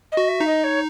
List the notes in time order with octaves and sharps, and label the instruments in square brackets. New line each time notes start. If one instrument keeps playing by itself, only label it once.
[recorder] D#5
[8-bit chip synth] F#4
[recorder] E5
[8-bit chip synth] D#4
[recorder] D#5
C#5